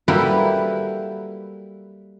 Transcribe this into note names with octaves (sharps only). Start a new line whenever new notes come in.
G3 A#3 E4 F#4 A4 B4